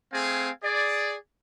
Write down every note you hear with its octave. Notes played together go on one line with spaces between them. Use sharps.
A3 C4 G#4 F5 G#5
G#4 D5